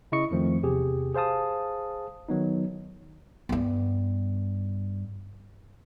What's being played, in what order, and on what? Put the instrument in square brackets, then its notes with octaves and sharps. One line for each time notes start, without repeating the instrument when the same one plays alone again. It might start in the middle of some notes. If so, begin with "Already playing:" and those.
[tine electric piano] C#3 E4 D#5 C#6 C#7
F2 D#3 F3 A3 C4
E2 C3 G4 G#4
G#4 C5 F5 A5 D#6
D#3 F#3 B3 D#4
[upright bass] G2 B3